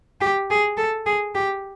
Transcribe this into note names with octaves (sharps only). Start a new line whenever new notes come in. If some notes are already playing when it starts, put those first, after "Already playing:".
G4
G#4
A4
G#4
G4